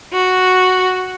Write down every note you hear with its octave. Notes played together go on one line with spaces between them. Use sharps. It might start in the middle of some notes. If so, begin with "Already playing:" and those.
F#4